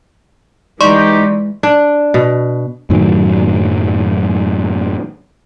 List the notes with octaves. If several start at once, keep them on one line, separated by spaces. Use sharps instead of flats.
E3 G#3 D#4 G4 D5 C6 C#6
D4
B2
F#2 A2 D#3 F#3